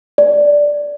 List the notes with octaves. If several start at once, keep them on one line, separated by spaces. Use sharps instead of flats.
D5